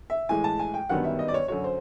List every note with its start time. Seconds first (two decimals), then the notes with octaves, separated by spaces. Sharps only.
0.10 E5
0.29 A2 E3 G#3 G#5
0.44 A5
0.59 G#5
0.74 G5
0.89 G1 F#2 D#3 G3 B3 F#5
1.04 E5
1.19 D#5
1.28 D5
1.34 C#5
1.48 F#2 D3 F#3 C#5
1.64 C5